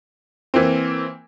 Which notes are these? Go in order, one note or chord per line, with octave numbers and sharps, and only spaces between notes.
E3 A#3 C4